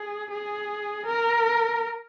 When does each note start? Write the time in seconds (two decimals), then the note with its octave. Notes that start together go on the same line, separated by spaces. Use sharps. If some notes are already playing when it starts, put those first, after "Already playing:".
Already playing: G#4
0.31 G#4
1.06 A#4